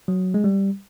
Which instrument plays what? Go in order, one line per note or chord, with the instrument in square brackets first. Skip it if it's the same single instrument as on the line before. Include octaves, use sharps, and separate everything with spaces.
[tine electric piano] F#3
G#3
G3